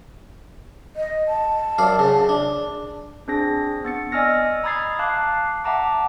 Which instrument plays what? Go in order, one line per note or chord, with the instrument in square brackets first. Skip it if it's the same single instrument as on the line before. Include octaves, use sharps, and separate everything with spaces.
[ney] D#5
A5
[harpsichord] F#2 D5 F5
C#3
D4
[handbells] C4 D4 G#4 A#6
B3 A6 C#7
D5 D#5 G#5 E6 F6 A#6
A#5 B5 D#6 G#6 A6 C7
F5 A5 D6 F#6 C7
E5 F#5 A5 A#5 D6